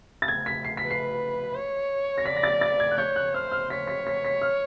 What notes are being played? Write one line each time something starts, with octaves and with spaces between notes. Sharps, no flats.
A6
G#6
B6
C7
B6
B4
C7
C#5
A#6
D5 B6
A#6
A6
A6
G#6
F#6
C#5 G6
F#6
C5 F6
F6
C#5 B6
B6
B6
B6
F6